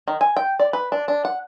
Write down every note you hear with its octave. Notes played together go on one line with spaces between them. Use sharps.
D#3
G#5
G5
D5
B4
D4
D4
F#5